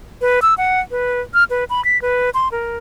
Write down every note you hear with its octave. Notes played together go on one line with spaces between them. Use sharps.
B4
E6
F#5
B4
F6
B4
B5
B6
B4
C6
A#4